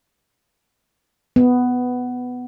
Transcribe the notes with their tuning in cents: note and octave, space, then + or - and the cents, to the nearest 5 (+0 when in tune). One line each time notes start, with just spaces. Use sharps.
B3 +10